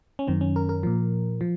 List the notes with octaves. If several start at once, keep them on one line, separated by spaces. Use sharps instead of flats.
C#4
F#2 D#3 C4
C#4
A#4
A#4
A#2 F3
F3